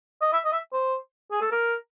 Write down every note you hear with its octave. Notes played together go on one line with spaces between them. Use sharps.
D#5
E5
D#5
E5
C5
G#4
A4
A#4